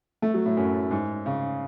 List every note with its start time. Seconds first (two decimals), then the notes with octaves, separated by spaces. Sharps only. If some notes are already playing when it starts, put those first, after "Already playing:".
0.22 A3
0.34 F#3
0.46 A2
0.57 F#2
0.91 G#2
1.26 C#3